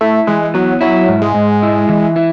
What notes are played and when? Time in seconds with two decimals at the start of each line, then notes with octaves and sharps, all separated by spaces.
0.01 A3 E4
0.27 E3 G#3
0.54 F#3 B3
0.81 F#3 E4
1.08 G#2
1.22 G#3
1.35 G#2
1.63 E4
1.89 E3
2.16 E4